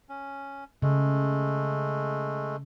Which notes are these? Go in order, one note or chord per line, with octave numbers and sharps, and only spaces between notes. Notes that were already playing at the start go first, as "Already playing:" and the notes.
C#4
C#3 G#3 A3